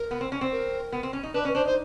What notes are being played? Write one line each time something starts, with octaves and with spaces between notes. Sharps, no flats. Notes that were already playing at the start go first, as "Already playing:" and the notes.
Already playing: A#4
B3
C4
C#4
C4
A#4
B3
C4
C#4
D#4
D4 B4
C#4
D4 C5
D#4 C5